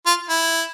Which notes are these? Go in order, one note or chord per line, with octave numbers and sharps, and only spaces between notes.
F4
E4